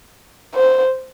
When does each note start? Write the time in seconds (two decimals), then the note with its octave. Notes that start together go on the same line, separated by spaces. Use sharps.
0.55 C5